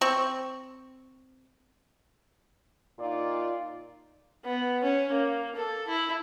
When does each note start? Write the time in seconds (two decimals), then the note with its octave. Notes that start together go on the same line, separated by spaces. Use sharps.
0.01 C4 C#6
2.99 A#2 D#4 F4 D5
4.45 B3
4.83 C#4
5.12 A#3
5.56 A4
5.88 E4